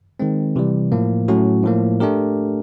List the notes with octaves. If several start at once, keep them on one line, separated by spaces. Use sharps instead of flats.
D#3 G#3 C4
C3 E3 G3
A2 F3 A#3
A2 F#3 A3 C#4 F#4
A2 F3 A#3
A3 D4 G4 A#4